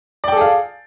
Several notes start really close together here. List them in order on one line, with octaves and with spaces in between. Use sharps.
D5 G5 A4 G#4 F5